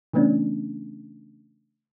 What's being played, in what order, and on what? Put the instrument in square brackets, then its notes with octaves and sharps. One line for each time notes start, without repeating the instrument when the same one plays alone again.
[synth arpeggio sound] C#3 E3 A3 B3 C#4 D4